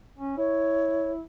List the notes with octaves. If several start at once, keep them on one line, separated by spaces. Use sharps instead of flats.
C#4
E4 C#5